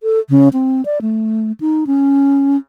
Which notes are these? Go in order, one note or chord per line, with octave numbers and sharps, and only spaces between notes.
A4
C#3
C4
D5
A3
D#4
C#4